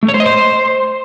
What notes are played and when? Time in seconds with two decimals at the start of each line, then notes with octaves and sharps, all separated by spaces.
0.03 A3
0.08 C#5
0.14 C5
0.20 D#5
0.26 C5